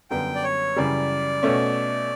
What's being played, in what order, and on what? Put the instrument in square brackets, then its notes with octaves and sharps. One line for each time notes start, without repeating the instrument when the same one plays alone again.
[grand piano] F#2 D3 G3 B3 [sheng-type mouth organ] G5
[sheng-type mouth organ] D5
C#5
[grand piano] F#2 C#3 E3 G3 [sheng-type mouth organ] D5
[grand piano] B2 A3 C#4